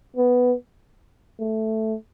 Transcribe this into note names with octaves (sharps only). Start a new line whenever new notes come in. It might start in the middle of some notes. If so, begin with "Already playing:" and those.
B3
A3